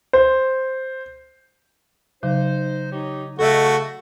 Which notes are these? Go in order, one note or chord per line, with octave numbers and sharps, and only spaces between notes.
C5
C#3 F#3 D#4 C5
D#4 G4 C#5
C#3 A3 F#4 A4 D#5